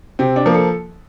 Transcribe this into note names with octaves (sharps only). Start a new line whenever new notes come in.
C3 C4
D4
F3 A#3
A4